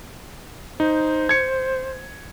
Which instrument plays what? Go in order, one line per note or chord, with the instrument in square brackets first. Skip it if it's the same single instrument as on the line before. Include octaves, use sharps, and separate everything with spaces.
[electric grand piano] D#4 [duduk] C5
[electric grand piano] G#6 C#7